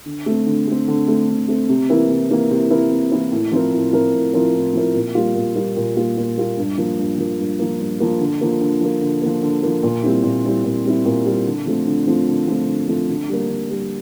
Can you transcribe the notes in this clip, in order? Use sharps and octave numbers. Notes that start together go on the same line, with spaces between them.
D3
A3 C4
D3
A3 C4
D3
A3 C4
D3
A3 C4
C3
E3 A#3 E4 A#4
C3
E3 A#3 E4 A#4
C3
E3 A#3 E4 A#4
C3
E3 A#3 E4 A#4
A2
F3 C4 E4 A#4
A2
F3 C4 E4 A#4
A2
F3 C4 E4 A#4
A2
F3 C4 E4 A#4
A#2
G3 A#3 F4
A#2
G3 A#3 F4
A#2
G3 A#3 F4
A#2
G3 A#3 F4
G2
F3 A#3
G2
F3 A#3
G2
F3 A#3
G2
F3 A#3
D3
F3 A#3
D3
F3 A#3
D3
F3 A#3
D3
F3 A#3
A#2
G3 C4 E4
A#2
G3 C4 E4
A#2
G3 C4 E4
A#2
G3 C4 E4
D3
F3 A3 C4
D3
F3 A3 C4
D3
F3 A3 C4
D3
F3 A3 C4
D3
G3 A#3
D3
G3 A#3